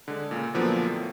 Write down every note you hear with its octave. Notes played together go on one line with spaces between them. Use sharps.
D3 G#3
A#2 C#3
A#2 D3 F3 F#3 A#3 B3
A2